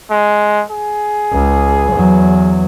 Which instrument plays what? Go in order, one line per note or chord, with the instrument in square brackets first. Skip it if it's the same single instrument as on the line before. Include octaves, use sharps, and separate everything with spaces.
[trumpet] G#3
G#4
[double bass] C#2
E2 F#3